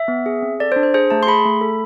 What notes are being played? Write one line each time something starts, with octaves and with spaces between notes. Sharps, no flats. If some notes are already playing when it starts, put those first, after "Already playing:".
Already playing: E5
B3
G#4
C4
A4 D5
C5
D4
C5
G#4 C5
A3 A5
C6
G#4 B5
A3
A4